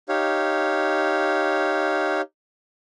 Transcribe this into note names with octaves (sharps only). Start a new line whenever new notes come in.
D#4 G4 C#5 F5